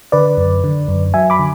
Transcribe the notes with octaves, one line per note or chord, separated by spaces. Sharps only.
D3 B4 D5
F#2
D3
F#2
F#3 E5 G#5
B5 D6
D3